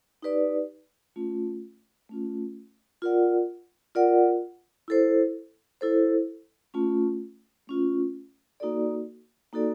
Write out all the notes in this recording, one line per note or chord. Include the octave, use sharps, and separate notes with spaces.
D#4 G4 B4 D5
A3 C#4 F4
A3 C#4 F4
F4 A#4 D5 F#5
F4 A#4 D5 F#5
E4 A4 C5
E4 A4 C5
A3 C#4 F4
A3 C#4 F4
A#3 D#4 F#4 A4 D5
A#3 D#4 F#4 A4 D5